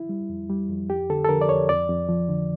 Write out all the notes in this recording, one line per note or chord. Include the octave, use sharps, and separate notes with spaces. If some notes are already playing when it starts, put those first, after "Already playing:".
Already playing: E4
G3
F2
G3
F2
F2 G4
D3 A4
A4
D3 A#4
D5
F2 C#5
F2 D5
F2
F3
D3